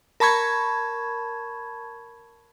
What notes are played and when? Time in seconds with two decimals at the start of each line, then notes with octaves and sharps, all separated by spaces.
0.20 A#4 A5 B5 C#6 G#6